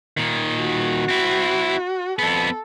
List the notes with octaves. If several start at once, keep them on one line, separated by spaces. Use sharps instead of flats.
A#2 D#3
F#4
C4 E4
F2 B3 A4